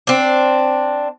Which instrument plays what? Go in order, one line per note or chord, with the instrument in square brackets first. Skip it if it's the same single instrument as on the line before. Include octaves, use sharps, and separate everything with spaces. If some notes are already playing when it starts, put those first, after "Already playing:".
[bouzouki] C4 D4